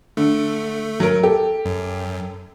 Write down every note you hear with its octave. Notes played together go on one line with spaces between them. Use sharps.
D3 A3
F#3 A#4
G4 A4
F#2